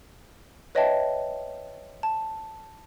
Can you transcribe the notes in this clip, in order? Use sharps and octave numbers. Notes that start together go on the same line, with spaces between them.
B4 C#5 D#5 E5 G5 A5
A5